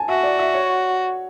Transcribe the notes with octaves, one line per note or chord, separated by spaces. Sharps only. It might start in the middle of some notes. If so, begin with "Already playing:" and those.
Already playing: G#5 A5
F#4 E5
D5
E5
C#5